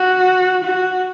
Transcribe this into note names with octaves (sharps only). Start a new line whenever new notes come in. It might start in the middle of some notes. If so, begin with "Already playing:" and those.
Already playing: F#4
F#4